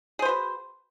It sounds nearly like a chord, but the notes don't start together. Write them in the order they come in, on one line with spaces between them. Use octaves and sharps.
G#4 C5 B4 F#4